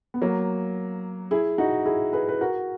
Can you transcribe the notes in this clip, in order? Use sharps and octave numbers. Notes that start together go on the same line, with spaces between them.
B3
F#3 A#3
E4 G#4
D#4 F#4
E4 G#4
G#4 B4
B4
F#4 A#4